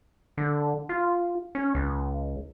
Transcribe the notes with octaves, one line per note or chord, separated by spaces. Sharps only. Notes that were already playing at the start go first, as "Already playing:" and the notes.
D3
F4
C#4
C#2